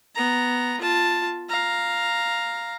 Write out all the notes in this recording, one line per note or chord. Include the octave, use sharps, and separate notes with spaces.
B3 A#5
F4 A5
F5 A#5